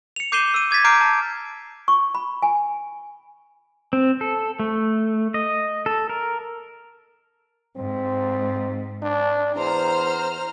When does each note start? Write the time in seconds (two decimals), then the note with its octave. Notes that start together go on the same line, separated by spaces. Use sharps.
0.16 C#7 F7
0.32 D6 G6 C7 D#7 E7 G7
0.54 E6 D#7
0.71 D6 G#6 A6 B6
0.84 A#5 D6 F6 G6 C7 D7
1.01 A5
1.88 C#6
2.15 B5
2.42 G#5
3.93 C4
4.21 A4
4.60 A3
5.34 D#5
5.86 A4
6.09 A#4
7.76 G#2 C4
9.02 D4
9.56 E2 C5 A#5 F6